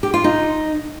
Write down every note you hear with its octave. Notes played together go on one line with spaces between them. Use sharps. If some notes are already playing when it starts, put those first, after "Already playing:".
G4
F4
D#4